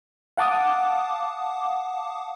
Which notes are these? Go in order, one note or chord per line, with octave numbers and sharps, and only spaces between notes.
F5 F#5 A5 D6 D#6